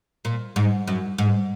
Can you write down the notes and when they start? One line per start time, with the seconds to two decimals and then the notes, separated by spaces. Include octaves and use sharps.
0.25 A#2
0.56 G#2
0.88 F#2
1.18 G#2